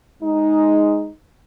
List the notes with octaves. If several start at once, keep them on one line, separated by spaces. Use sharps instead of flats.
G#3 D#4